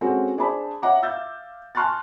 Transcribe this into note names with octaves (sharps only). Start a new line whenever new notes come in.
G#3 C4 C#4 F#4 A4
D4 G#4 C5 D5 A5 B5
C#5 D#5 E5 F#5 A#5 D6
E5 F5 E6 G6 A6
G#5 A5 C6 F6 F#6 A6